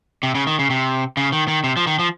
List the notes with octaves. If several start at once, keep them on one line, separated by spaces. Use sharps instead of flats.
C3
C#3
D#3
C#3
C3
C#3
D#3
D#3
C3
F3
D#3
F3